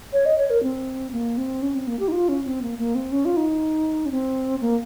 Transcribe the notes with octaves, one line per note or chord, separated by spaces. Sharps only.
C#5
D#5
C#5
A#4
C4
A#3
C4
C#4
C4
A#3
G4
D#4
F4
C#4
C4
A#3
A#3
C4
C#4
F4
D#4
C#4
C4
A#3